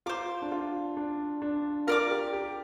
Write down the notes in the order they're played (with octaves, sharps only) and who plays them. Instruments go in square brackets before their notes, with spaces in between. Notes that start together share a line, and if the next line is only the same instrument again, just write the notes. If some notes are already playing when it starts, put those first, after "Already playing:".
[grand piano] F4 [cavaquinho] C5 A#5 D6
[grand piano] D4
F4
D4
D4
[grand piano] F4 [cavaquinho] A#4 D5 A#5 D6
[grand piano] G4
G4